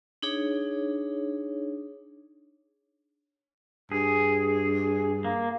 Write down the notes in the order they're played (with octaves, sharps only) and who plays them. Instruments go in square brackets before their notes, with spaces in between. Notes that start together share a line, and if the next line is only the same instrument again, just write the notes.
[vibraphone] D4 D#4 G#4 C#5
[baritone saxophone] G2 [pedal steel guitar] G#4
[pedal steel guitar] A#3